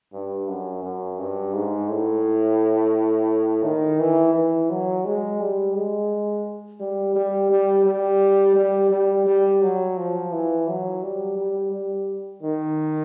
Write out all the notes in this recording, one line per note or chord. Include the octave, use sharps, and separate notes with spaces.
G2
F#2
F#2
G2
G#2
A2
D#3
E3
E3
F#3
G#3
G3
G#3
G3
G3
G3
G3
G3
G3
G3
F#3
F3
E3
F#3
G3
G3
G3
D#3